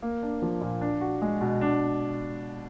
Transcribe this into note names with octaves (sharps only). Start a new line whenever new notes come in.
A#3
D4
F3
A#2
D4
F#4
G#3
B2
D4